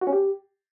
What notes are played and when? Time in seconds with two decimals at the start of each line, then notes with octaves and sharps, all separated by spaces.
0.01 F#4
0.07 C#4
0.13 G4